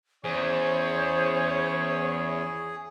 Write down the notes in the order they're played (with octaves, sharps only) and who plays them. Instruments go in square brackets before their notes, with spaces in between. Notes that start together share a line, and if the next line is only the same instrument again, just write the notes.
[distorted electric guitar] E2 [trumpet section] C#4 C#5 [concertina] G#4 [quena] C5